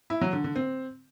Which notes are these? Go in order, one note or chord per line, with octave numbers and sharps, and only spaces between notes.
E4
F#3
D3
D3
C4